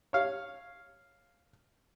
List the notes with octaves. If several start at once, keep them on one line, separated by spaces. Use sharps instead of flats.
C#5 F5